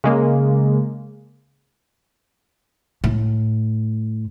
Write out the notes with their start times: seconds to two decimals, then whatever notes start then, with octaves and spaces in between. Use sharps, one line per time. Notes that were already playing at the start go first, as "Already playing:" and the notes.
0.04 C#3 G#3 A#3
3.04 A2